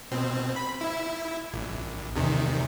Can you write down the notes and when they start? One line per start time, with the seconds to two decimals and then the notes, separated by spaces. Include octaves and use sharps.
0.11 B2 C4
0.56 B5
0.81 E4
1.53 A#1
2.16 E2 C3 D#3